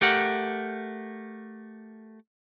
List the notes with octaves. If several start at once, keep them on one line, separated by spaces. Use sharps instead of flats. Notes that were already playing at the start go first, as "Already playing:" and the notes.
A3 G4 A#4 F#5